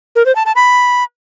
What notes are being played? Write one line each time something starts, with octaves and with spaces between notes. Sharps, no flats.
A#4
C5
A5
A5
B5